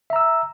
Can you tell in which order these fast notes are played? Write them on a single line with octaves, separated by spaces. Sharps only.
E5 A#5 E6